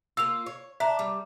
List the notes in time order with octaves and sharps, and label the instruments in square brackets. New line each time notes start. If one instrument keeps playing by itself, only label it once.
[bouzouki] A#3 F4 [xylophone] E6 F7
[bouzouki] C#5
[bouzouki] D4 [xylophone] E5 A#5
[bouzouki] G3